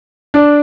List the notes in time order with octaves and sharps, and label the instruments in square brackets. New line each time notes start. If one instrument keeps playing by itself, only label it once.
[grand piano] D4